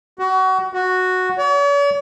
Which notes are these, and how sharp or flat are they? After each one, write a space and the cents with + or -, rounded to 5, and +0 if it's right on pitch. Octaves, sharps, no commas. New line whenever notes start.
F#4 +25
F#4 -5
C#5 +45